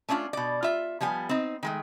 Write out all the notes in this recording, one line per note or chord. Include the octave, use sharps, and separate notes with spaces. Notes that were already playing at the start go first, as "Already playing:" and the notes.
A3 C#4 D4 E4 F4
B2 D5
F4 E5
F3 G3 B3 G#5
C4 D#4
D#3 G#3 A3